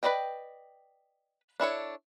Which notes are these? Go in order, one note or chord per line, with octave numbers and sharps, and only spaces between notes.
B4 C5 D5 D#5 G5
D4 E4 A4 C#5